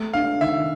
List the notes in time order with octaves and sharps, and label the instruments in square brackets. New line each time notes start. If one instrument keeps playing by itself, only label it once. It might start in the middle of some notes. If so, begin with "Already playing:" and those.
Already playing: [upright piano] A3
[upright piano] D4 [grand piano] F5
[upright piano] D#3 [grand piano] E5